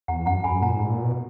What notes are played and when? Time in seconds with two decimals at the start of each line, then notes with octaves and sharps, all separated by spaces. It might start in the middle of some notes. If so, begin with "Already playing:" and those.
0.08 E2 F#5 A#5
0.26 F#2 F#5 A#5
0.44 F#2 G#5 B5
0.62 A#2 F#5 A#5
0.76 G#2
0.89 A#2
1.03 B2